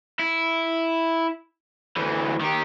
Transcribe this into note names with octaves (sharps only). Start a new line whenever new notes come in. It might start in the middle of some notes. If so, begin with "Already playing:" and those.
E4
D2 E3
D#3 G4